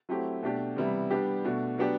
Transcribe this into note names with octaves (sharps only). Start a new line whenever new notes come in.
F#3 A3 C4 E4 G4
B2 A3 D4 G4
C3 E3 G3 B3 E4
G3 B3 D4 G4
B2 A3 D4 F#4
F#3 B3 D4 G4